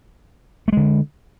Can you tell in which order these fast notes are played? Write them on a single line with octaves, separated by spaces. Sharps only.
A3 G#3 D3